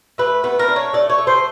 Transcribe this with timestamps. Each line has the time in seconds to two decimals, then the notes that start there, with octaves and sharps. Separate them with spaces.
0.18 A3 B4
0.44 B3 B4
0.59 A#4
0.68 D4
0.76 C#5
0.93 A3 D5
1.10 C#5
1.18 A3
1.27 C5